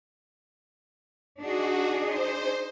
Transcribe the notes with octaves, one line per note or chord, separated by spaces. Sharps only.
D4 D#4 F#4 G#4
C5